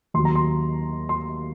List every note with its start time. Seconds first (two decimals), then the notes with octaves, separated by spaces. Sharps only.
0.14 D#2 D#3 F#3 C6
0.25 A#5
0.35 C6
1.09 C6